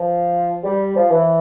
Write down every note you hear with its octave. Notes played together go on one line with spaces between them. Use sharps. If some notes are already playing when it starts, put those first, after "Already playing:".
Already playing: F3
G3
F3
E3